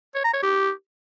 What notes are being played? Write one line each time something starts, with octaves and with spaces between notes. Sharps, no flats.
C#5
A#5
C#5
G4